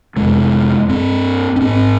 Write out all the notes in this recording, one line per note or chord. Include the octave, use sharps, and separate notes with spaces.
F2 C3 G#3
G2 C4
C#4
G#2 C4